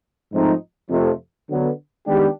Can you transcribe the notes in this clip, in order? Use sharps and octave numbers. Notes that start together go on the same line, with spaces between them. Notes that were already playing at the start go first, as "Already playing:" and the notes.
G#2 F3 A3 C4 D#4
F2 C3 F3 A3
D3 F#3 B3
D#3 G#3 B3 D4 G4